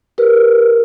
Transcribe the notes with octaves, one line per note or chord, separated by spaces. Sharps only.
G4 A#4 B4